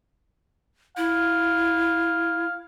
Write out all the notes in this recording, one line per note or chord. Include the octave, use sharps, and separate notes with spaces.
E4 F5